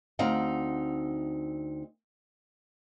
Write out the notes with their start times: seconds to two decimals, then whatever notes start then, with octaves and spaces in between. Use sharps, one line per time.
0.19 D2 C4 D#4 F5 F#5